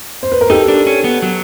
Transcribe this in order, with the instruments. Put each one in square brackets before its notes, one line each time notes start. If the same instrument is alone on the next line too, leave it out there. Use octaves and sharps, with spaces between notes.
[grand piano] C5
B4
A#4
[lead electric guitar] D#4 [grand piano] G4 A4
[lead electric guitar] D4
C#4
B3
F#3